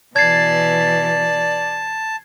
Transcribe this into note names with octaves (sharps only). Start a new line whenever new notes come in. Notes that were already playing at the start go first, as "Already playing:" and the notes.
B2 E3 D5 A5 G#6 C7